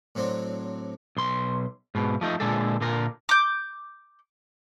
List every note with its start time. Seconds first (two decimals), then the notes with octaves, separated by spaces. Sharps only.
0.15 A2 F#3 C4 D4
1.17 B1 C6
1.95 G#2 B2
2.21 F3 A3 D#4
2.40 A#2 D3 G#3 A4
2.81 A#2 D3 A#4
3.29 D6 G6